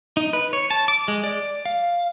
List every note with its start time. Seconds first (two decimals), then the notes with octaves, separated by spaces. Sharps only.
0.17 D#4
0.33 B4
0.53 C#5
0.70 A5
0.88 D6
1.08 G#3
1.24 D5
1.65 F5